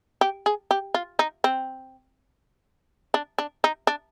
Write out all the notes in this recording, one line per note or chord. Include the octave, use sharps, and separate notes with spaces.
G4
G#4
G4
F4
D#4
C4
D4
D4
D#4
D4